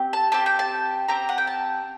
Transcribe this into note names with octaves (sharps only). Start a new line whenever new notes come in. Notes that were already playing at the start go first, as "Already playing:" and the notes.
Already playing: C4 G4
A5
C4 G4 A5
G5
A5
C4 G4 A#5
F#5
G5
A5